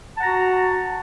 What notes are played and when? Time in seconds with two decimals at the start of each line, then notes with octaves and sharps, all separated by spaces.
0.16 A5
0.20 F#5
0.23 A#5
0.26 F#4